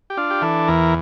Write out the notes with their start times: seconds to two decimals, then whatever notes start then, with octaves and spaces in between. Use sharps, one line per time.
0.10 G4
0.17 D4 F4
0.31 G4
0.42 E3 A4
0.68 E2 A#4